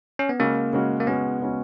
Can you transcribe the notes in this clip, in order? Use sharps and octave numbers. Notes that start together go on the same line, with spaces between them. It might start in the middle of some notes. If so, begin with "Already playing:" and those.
C#4
B3
C#3 G#3 A#3 C#4 F#4
C#3 G#3 C#4 F#4
A#3
C#3 G#3 B3 C#4 F#4
C#3 G#3 C#4 F#4